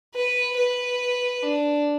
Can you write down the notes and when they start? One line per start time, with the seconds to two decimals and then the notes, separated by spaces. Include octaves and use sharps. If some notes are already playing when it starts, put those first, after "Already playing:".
0.15 B4
0.57 B4
1.43 D4